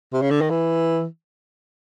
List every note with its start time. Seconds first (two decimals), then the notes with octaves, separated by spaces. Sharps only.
0.13 C3
0.22 C#3
0.31 D3
0.41 D#3
0.50 E3